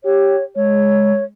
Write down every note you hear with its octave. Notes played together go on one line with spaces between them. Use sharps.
G4 C#5
G#3 C#5